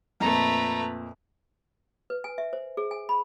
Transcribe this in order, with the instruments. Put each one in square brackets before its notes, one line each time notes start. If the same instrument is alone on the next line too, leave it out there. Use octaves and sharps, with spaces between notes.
[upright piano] F2 A#2 [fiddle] A3 B4 [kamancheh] A#5
[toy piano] B4
G#5
E5
C5
G#4
G#5
B5